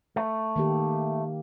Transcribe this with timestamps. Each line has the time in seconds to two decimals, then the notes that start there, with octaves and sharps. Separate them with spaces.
0.16 A3
0.56 D#3 A#3 G4